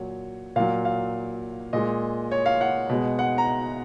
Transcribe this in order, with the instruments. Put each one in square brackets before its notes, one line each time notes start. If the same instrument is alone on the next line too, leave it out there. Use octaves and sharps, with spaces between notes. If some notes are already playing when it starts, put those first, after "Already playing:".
Already playing: [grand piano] A#2 F#3 C#5
A#2 F#3 F5
F5
A#2 G#3 D#5
C#5
F5
F#5
B2 G#3
F#5
A#5